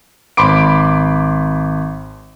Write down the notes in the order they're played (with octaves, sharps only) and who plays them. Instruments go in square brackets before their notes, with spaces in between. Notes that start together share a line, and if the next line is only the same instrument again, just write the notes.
[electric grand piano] G#1 B5 C6 D6 D7